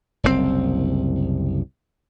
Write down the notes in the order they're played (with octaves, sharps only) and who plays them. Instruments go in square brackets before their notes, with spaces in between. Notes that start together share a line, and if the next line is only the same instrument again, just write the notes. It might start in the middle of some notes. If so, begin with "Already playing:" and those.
[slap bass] F#1 C2 B2 C4